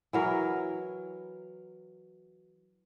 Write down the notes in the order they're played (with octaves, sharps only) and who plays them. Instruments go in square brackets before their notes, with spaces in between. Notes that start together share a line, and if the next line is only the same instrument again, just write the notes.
[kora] E3 F#3 A#4